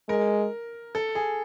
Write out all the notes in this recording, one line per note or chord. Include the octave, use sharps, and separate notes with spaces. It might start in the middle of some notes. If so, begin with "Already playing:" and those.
G#3 A#4
A4
G#4